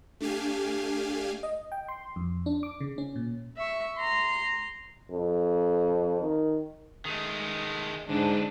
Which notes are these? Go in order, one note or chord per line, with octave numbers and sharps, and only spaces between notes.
A3 D4 G4 F5 G#5
D#5
G5
C6
F2
D4
D6
C#3
C#4
A#2
E5 C#6
A#5 C6
F2
D#3
D#3 A3 G#4 D#5
G#2 D3 D4 B4